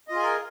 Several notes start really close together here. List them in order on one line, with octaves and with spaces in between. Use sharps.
D#5 F4 G#4 G#5 A#4